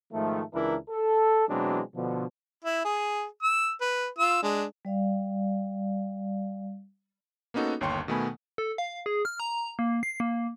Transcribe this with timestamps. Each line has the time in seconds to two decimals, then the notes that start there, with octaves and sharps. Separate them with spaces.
0.13 G#2 D#3 F3 A3
0.54 C#2 E3 D4 E4 A#4
0.90 A4
1.49 B2 E3 F#3 G#3 C4 D4
1.95 B2 D3 F3
2.64 E4
2.84 G#4
3.43 E6
3.81 B4
4.19 F4 E6
4.43 G#3 D4
4.85 G3 D5 F5
7.54 A#3 B3 C#4 D#4 F#4 A4
7.81 G1 D#2 C#5 G5 C6 C#6
8.08 B2 D#3 A3 B3 G#5 B5
8.58 A4
8.78 F5
9.06 G#4
9.25 F6
9.40 A#5
9.79 A#3
10.03 C7
10.20 A#3